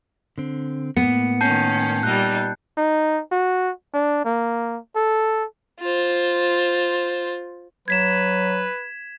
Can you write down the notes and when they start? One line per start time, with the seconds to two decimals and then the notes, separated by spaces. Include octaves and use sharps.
0.38 D3 C4
0.97 A2 A#3 B3 C#7
1.41 D#3 C#4 A5 G6 C7
2.03 A#2 G3 D#4 F#6
2.77 D#4
3.32 F#4
3.94 D4
4.25 A#3
4.95 A4
5.80 F4 C5
7.88 F#3 B4 G#6 B6 E7